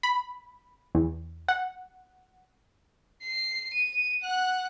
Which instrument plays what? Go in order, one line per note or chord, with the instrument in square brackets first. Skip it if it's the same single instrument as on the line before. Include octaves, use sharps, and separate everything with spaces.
[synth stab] B5
E2
F#5
[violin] C7
D#7
F#5 F#6